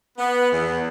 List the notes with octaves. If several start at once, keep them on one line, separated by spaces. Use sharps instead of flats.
B3
E2